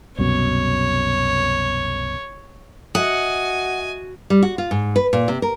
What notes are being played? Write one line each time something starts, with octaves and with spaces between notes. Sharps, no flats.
C2 F#2 B2 C#5
F#4 D#5 E5 F#5 G#5 D#6
G3
F#4
F4
G#2
B4
A#2
C3
A#4